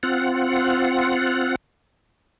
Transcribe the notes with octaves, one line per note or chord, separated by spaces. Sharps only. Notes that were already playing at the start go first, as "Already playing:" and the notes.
C4 F4 F#5